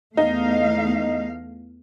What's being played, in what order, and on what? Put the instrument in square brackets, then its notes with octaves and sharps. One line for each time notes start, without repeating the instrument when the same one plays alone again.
[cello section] E2 A3 F5 [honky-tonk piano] D#4